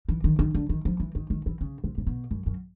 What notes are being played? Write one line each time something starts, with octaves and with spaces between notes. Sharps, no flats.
E3
D#3
D#3
D3
D#3
F3
E3
D#3
D#3
E3
C#3
C3
C3
B2
F#2
F#2